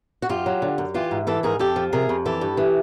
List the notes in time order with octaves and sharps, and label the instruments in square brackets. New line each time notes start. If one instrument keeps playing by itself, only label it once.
[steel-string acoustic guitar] F#4
F#2 F4 G4
F#3
D3
F#2
E3 F4 G4
G#2
E3 G4 A4
G#2 G#4 A#4
F2 G4 A4
F3
C3 G#4 A#4
F2
E3 G4 A4
G2
E3